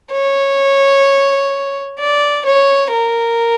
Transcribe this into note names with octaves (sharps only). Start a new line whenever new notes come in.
C#5
D5
C#5
A#4